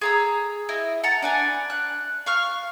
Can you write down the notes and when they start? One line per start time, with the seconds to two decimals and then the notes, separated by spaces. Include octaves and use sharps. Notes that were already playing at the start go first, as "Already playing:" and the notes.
0.01 G#4 A#5 E6
0.69 E4 D#5
1.04 F#5 A5 A#5
1.22 D4 B4 G#5
1.70 F#6
2.26 F5 C#6 F6